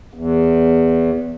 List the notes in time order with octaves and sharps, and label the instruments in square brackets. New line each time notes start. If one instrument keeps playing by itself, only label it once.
[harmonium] E2